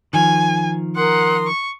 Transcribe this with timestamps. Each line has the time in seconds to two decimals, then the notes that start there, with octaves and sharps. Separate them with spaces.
0.13 D#3 F3 G#5
0.96 A#4 F#5 C6 D#6
1.47 C#6